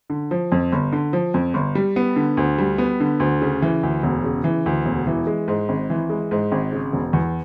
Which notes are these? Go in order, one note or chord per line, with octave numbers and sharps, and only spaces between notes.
D3
F3
F2
G1
D3
F3
F2
G1
G3
B3
D3
D2
G3
B3
D3
D2
C#3
E3
D2
E1
C#3
E3
D2
E1
E3
G#3
G#2
G#1
E3
G#3
G#2
G#1
C#3
E1
E2